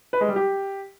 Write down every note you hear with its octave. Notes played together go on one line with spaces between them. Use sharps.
B4
G#3
G3
G4